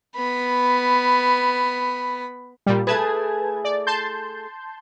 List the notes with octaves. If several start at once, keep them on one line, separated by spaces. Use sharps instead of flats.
B3 B5
A#2 G3
A3 E4 G#4 B4 A5 G#6
D5
A5 C6 G6